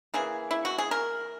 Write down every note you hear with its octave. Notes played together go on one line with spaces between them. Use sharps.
C#3 E3 A#3 G#4
E4
F#4
G#4
A#4